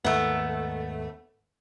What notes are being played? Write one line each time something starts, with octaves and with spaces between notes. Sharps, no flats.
D#2 G#2 D#3 A3 B3